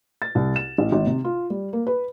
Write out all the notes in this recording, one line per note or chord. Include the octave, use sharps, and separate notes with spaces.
A6
C2
E7
A1
G#1
C3
F4
G3
A#3
B4